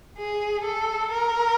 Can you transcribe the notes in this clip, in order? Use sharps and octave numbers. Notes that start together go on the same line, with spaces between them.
G#4
A4
A#4